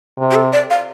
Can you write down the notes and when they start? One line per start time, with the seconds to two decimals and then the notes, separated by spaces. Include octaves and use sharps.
0.18 C3
0.31 G4
0.35 A4
0.53 D5
0.70 F5